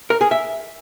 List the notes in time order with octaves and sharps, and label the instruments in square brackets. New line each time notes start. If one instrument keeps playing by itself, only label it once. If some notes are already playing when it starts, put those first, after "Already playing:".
[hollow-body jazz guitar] A#4
G#4
E5